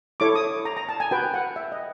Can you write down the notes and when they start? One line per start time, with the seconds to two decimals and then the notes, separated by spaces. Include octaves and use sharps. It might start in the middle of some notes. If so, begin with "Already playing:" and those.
0.20 E4 A4 C#5 D6
0.35 D#6
0.65 A#5
0.77 A#5
0.89 A5
1.00 G#5
1.11 F#4 B4 G5
1.34 F#5
1.56 E5
1.72 D#5